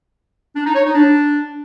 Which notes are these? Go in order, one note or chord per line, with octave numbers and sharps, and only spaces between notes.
D4
D#4
C#5
D#4
D4